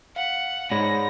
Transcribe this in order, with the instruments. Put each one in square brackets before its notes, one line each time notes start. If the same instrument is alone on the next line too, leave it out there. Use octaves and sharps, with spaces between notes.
[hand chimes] F5 [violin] F#5
[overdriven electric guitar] G#2 [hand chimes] C#5 D5 B5 [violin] A#6